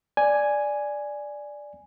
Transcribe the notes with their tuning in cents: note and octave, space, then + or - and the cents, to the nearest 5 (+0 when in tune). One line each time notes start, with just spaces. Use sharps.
D5 +0 G#5 +0